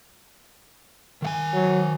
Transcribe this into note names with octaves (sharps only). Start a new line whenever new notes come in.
D#3 F5 G#5
F#3